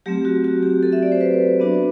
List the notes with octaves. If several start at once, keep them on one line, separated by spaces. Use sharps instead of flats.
F#3 A3 C4 G4
F#4
F#4
G4
A4
E5
D5
C5
B4
B3 D4 F#4